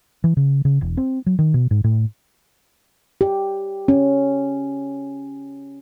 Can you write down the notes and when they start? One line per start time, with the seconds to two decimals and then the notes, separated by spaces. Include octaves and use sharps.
0.24 E3
0.37 C#3
0.65 C#3
0.81 E1
0.97 C4
1.26 F#3
1.39 D#3
1.54 B2
1.71 G#2
1.84 A2
3.21 G4
3.88 C#4